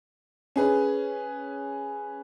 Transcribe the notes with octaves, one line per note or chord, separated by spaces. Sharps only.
C#4 G#4 B4